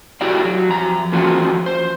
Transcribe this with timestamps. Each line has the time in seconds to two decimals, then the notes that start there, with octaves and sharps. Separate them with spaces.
0.21 E4 F#4 G4 D5 F5
0.45 F#3
0.69 F2 A#5
1.12 E3 F3 A#3 C#4 F4 F#4
1.66 C5